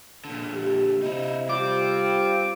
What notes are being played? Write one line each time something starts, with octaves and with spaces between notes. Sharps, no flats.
A#2 D3
G4
C3 D#4 E4
G3 C4 F4 D6